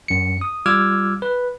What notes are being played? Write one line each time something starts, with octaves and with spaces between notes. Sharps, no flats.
F#2 C#7
D#6
G3 F4 D6 E6 F6 G#6
B4